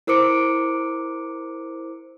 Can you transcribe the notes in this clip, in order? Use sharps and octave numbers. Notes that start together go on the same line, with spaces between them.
E4 A#4 C5 D6 C#7 D7